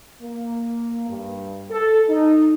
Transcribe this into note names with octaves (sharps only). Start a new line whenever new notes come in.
A#3
G2
A4
D#4